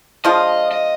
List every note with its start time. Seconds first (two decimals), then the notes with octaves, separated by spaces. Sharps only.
0.24 F3 G#3 D4 F4 D#5
0.71 D#5